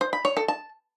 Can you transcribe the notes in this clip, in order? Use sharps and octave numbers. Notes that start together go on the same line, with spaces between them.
C5
B5
C#5
A4
A5